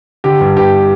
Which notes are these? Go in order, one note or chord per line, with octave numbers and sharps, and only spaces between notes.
D3 G4
G2
G1 G4